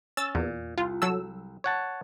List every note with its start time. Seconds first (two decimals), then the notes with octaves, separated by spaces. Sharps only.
0.17 C#4 E6 A6
0.35 E2 A#2
0.78 C2 F4
1.02 F#3 A4 E6
1.64 C#5 F#5 A5